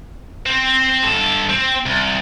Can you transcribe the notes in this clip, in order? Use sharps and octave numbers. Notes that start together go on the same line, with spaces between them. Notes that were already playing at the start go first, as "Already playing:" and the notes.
C4
G2 A4
C4
C2